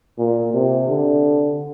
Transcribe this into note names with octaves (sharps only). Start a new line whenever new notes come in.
A#2
C3
D3